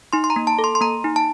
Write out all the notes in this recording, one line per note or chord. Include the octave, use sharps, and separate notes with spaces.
D#4 C6
C6
A#5
A#3
A5
A4
C6
C6
A#3 A#5
D#4
A5